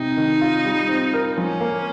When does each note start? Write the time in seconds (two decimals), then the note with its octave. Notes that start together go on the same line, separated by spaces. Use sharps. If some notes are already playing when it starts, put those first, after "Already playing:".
Already playing: C3 D#4
0.17 D#3
0.41 F4
0.65 G3
0.89 C4
1.14 A#4
1.37 F3 C#4
1.61 A#3